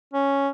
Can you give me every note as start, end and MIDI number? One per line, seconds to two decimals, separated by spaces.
0.14 0.49 61